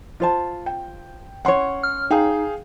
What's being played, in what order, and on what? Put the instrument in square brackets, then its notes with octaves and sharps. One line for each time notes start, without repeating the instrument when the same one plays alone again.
[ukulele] F4 C5 A5
[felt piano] G5
[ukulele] C#4 C#5 [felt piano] F#5 C6
[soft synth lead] F6
[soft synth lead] D#4 [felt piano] G#4 F5 G5